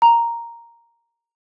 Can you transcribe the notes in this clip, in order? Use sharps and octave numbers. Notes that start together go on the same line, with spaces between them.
A#5